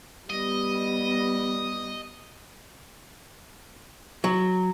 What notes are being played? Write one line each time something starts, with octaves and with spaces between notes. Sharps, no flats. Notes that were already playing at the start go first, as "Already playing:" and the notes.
G3 B3 D#5
F#3